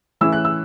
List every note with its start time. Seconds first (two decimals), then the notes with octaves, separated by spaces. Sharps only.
0.21 A2 E3 C#4 E4 E6
0.32 F#6
0.45 E6